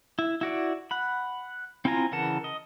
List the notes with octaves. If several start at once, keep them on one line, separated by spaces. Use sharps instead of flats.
E4
E4 F#4 D5
F#5 B5
C4 E4 F4 G#5 A#5
C#3 E3 A#4 F#5 A5
D#5